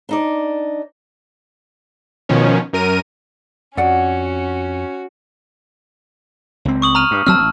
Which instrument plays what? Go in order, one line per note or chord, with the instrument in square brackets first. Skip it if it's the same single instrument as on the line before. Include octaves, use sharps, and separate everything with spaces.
[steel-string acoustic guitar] D4 D#4 D5
[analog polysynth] B2 D#3 F3 C#4
F#2 A#4 D#7
[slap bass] F2 [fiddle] C#4 [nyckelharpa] F#4 [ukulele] D5 F#5
[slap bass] C#2 C4
[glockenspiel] C#6 D#6 F#7
A#5 F6 D#7
[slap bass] G2
[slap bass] D2 F#3 C4 [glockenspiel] A5 E6 F6
[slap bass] A1